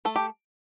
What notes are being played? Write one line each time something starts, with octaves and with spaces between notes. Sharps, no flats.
A3 A4
G4